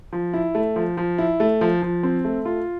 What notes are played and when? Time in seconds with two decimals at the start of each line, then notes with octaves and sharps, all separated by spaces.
0.12 F3
0.33 E4
0.55 A3
0.76 F3
0.97 F3
1.18 E4
1.40 A3
1.61 F3
1.82 F3
2.03 C4
2.25 A3
2.45 F4